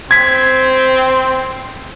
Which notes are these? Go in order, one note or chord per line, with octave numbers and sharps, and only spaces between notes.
C4 G#6 B6